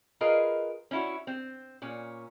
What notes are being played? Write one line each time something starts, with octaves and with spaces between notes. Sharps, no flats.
F4 G#4 A#4 B4 D#5
C#4 E4 F#4
C4
A#2 C#4